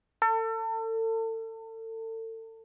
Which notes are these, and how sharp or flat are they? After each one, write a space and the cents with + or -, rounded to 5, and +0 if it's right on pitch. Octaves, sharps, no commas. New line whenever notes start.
A4 +35